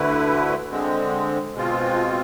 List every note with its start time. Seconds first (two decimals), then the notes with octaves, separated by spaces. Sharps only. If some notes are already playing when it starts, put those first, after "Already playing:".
Already playing: D2 D3 A3 E4 B4
0.71 D3 G#3 C4
1.55 B2 G#3 C4 F4